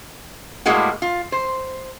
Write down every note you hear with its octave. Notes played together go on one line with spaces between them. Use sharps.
A2 G3 G#3 A#3 F#4
F4
C5